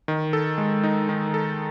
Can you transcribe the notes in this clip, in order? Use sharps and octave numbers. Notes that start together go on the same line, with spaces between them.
D#3
A4
G#3
D#4
D#3
A4